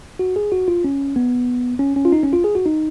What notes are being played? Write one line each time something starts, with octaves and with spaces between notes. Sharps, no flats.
F#4
G#4
F#4
F4
C#4
B3
C#4
C#4
F4
D#4
C#4
F4
G#4
F#4
D#4